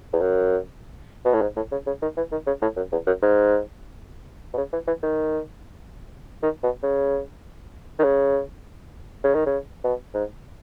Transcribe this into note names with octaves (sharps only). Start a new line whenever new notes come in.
E2
F#2
B2
A2
G#2
A2
C#3
C#3
D#3
E3
D#3
C#3
A2
F#2
E2
F#2
G#2
B2
C#3
E3
E3
D#3
D#3
B2
C#3
D#3
C#3
C#3
D#3
C#3
B2
G#2